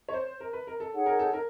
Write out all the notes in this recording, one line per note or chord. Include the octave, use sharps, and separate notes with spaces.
C#5
C5
A#4
B4
A#4
A4
D#4 G#4 C#5 F#5
A#4
A4
A#4